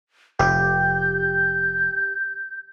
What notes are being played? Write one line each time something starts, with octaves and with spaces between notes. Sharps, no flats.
F1 G4 G6